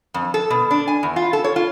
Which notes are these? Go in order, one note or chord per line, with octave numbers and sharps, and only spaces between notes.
F2
A4
B2
D4
G#5
E2
F4
A4
C#5
F4